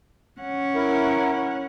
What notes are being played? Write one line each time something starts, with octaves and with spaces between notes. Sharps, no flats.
C#4 F#5
E4 A#4